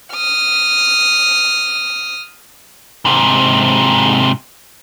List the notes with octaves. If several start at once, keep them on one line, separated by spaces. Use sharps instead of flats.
D#6 F6
G#2 C3